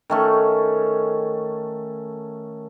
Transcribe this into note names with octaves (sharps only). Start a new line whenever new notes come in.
D#3 A3 C#4